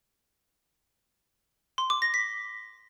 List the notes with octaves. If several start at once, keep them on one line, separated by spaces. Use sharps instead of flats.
C6
D6
A#6
B6